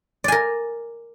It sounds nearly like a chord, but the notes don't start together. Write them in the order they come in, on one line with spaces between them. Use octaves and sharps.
D5 G#5 A#4